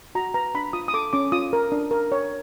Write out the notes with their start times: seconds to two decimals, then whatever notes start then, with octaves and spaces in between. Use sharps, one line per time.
0.15 F#4 A#5
0.34 B4 A#5
0.55 D4 B5
0.73 F4 D#6
0.88 D#6
0.94 A4 D6
1.13 C#4 D6
1.32 F4 D#6
1.53 A#4
1.72 D4
1.91 A#4
2.12 C#5